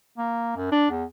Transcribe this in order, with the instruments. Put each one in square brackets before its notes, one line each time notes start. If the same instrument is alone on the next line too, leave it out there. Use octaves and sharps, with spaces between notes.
[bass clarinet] A#3
F#2
D4
E2